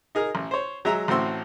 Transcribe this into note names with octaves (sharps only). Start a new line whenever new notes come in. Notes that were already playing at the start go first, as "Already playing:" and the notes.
D#4 G#4 A#4
A1
C5 C#5
F#3 G#3 E5 A#5
A1 A2 C4 F#4 C6 E6